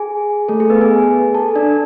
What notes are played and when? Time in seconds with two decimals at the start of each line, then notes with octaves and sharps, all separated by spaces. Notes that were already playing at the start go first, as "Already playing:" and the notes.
Already playing: G#4 G#5
0.49 A3 A4
0.60 G#4
0.70 B3 B4
0.81 G#4 G#5
1.35 A4 A5
1.55 D4 D5